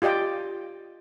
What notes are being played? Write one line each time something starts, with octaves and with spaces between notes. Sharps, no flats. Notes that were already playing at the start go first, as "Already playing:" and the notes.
F4 G4 D5 D#5 G5